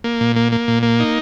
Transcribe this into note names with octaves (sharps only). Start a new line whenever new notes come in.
A#3
A#2
A#3
A#3
A#2
A#3
D#4